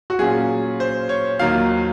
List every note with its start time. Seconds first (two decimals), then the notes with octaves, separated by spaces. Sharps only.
0.10 F#4
0.19 A#2 F#3 C#4 F4 G#4
0.80 C5
1.09 C#5
1.39 D#2 D#3 F#3 A#3 F4 F5